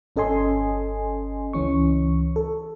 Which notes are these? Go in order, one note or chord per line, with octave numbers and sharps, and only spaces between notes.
G1 C#4 A4 D#5 G#5 C6
C#2 E3 C#4 C#6
A4